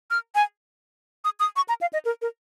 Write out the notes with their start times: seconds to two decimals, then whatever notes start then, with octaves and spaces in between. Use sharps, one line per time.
0.11 F6
0.35 G#5
1.25 D#6
1.40 D#6
1.56 C#6
1.69 A#5
1.81 F5
1.93 D#5
2.05 A#4
2.22 A#4